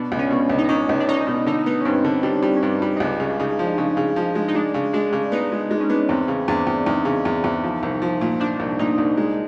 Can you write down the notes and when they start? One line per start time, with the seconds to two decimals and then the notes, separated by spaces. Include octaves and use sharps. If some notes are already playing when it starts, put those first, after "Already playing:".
Already playing: B2 D4
0.12 C#2
0.19 C#4
0.31 B2
0.50 C#2
0.58 D#4
0.69 C#4 D4
0.89 C#2
1.00 D4
1.08 C#4 D#4
1.27 B2
1.46 D3 D#4
1.66 B3 D#4
1.80 C#4
1.85 G2 C4
2.05 D3
2.23 G3 D4
2.43 G3
2.56 C#4
2.62 G2 D4
2.82 G3
2.96 D#4
3.00 C#2 D4
3.20 C#3
3.29 D4
3.40 C#3 D#4
3.59 F3
3.78 C#3
3.97 C#3
4.16 F3
4.35 G#3
4.48 D#4
4.54 G#3 D4
4.74 C#3
4.93 G#3 D4
5.13 C#3
5.32 B3 D#4
5.52 G#3
5.71 G#3 D4
5.80 C#4
5.89 B3 D4
6.09 E2 C4
6.28 C#3
6.48 E2 D4
6.67 E2
6.86 E2 D#4
7.05 C#3
7.25 E2
7.44 E2
7.63 F3
7.83 C2
8.02 F3
8.21 A#2
8.40 F3 D4
8.60 C2
8.79 A#2 D#4
8.98 C2
9.17 G#3